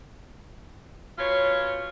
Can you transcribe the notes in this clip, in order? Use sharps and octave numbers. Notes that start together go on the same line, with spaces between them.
B2 F4 C#5